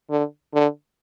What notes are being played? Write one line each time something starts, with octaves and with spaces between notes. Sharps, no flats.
D3
D3